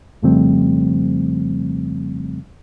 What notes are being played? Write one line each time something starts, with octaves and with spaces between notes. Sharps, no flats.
F2 C#3 F3 G3 A3 C4